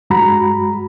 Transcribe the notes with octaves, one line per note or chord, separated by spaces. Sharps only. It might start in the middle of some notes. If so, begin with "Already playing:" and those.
G2 G#3 F#4 A#5 B5